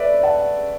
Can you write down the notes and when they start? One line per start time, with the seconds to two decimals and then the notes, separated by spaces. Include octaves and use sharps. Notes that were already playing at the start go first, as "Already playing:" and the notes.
Already playing: A4 B4 C#5 D5 E5
0.23 F#5 A5